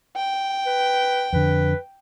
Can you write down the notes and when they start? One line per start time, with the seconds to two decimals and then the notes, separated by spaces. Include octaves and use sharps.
0.16 G5
0.66 B4
1.33 F2 D3 B4